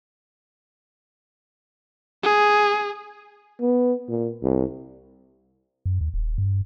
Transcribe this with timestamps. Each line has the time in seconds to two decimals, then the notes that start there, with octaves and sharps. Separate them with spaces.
2.23 G#4
3.61 B3
4.08 A#2
4.43 C2
5.86 F#2
6.01 D#2
6.14 D#1
6.38 G2